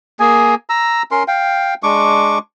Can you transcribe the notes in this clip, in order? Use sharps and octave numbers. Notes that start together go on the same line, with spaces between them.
A#3 G#4 G#5
A#5 E6
C#4 A#4 C6
F5 G5
G#3 D4 C#6 D6